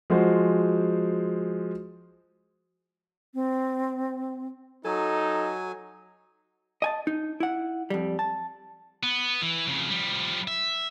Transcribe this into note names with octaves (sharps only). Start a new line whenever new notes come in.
F3 G#3 F#4 C5
C4
F#3 D#4 A4 G#5
D#5 G#5 A5
D#4
E4 F#5
F2 G3
A5
B3
E3
F2 C#3
F3 G3
E5